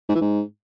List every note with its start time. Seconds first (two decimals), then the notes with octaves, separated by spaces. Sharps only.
0.09 G#2
0.15 E3
0.21 G#2